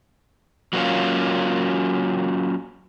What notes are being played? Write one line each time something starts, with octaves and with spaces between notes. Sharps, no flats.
F#3 A#3 C4 C#4 F4